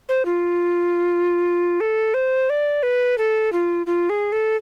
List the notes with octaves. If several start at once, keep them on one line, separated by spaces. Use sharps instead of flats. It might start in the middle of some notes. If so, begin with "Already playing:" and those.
C5
F4
A4
C5
D5
B4
A4
F4
F4
G#4
A4